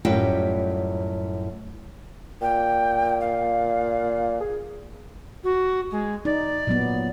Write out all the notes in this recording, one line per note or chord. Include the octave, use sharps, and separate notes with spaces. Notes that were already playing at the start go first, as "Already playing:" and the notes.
F#2 A2 G3 F4 B4 G5
A#2 G5
F5
G#4
F#4
G#3
D#4 D5
A#2 F#3 B3